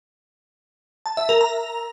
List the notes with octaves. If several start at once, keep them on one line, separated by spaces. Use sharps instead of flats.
A5
E5
A#4
A#5